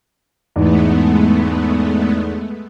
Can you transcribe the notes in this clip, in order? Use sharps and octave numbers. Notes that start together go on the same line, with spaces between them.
E2 G#2 E3 G#3 A3 B3